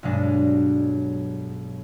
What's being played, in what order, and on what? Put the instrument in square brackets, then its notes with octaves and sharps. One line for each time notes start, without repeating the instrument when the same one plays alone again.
[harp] B1 G2 F#3 G#3 D4